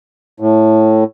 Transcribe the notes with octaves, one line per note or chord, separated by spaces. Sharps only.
A2